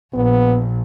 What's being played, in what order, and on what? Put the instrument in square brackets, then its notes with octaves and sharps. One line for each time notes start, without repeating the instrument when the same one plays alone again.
[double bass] A#1 [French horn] B3